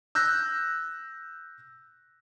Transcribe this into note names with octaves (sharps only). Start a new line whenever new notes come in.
E6 F#6 G6 A#6